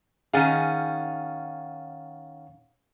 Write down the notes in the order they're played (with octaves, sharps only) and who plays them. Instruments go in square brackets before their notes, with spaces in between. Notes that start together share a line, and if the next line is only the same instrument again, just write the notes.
[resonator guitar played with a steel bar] D#3 C#4 G#4 [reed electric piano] F5 F#5 A6